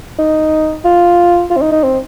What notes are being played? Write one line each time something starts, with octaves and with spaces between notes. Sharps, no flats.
D#4
F4
F4
C4
D#4
D#4
C4